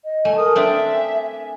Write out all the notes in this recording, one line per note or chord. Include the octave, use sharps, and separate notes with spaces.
D#5
A3 G#5
A#4 D#6
C4 D4 D5 E5
G#5